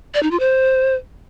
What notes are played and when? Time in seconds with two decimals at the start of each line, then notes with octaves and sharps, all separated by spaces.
0.14 D5
0.23 D#4
0.31 F4
0.40 C5